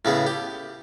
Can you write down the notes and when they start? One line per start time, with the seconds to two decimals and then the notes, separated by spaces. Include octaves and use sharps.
0.05 A2 C#3 B3
0.27 G4